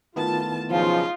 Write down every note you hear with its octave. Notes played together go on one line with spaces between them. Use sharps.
D#3 A3 B3 E4 F4 A5
B1 C#3 F3 D#4 F4